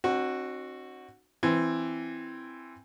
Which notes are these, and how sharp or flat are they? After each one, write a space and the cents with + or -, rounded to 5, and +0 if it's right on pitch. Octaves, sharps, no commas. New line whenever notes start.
C4 +35 D#4 -35 F#4 +0
E3 +10 C4 +0 G5 +0